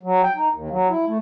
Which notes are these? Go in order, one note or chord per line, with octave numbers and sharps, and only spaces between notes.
F#3
G5
D#4
D#2
F#3
E4
A3